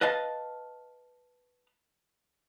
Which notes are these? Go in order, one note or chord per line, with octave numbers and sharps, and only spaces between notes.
B4 D#5 F5 A5